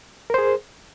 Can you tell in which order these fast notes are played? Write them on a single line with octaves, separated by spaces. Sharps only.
A#4 C5 G#4